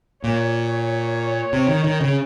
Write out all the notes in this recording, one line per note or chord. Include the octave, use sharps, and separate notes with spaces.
A#2 C#5
C#5
C3
D#3
D#3
C#3